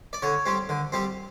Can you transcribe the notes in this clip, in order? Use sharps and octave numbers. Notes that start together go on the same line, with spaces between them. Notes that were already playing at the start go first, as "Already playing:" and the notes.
D5
D3 C#5
G3 C4
D3
G3 C4